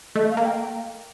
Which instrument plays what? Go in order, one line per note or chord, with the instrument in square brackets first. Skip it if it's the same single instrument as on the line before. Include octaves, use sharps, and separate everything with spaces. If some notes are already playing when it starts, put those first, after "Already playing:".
[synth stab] A3 [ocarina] D#5
[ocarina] F5
[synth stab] A#3
[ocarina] G5